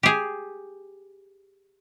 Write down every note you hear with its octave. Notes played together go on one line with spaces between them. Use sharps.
G4 G#4